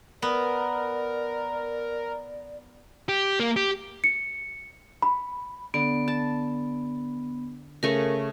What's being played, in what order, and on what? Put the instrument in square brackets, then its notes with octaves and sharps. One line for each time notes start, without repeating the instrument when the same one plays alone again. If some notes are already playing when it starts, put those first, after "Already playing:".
[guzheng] B3 [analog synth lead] A#4 [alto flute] D5
[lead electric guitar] G4
A#3
G4
[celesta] C#7
B5
[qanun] D3 [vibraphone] B3
[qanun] A5
[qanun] C#3 A3 C#6 [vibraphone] A#4